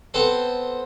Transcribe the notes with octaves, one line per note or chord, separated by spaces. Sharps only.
B3 C4 A4 A5 C6